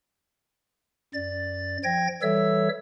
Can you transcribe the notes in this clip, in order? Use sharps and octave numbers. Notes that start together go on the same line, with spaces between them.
F#2 D5 A6
F3 G5 G#6 A#6
E3 G3 A4 C#5 E5 E6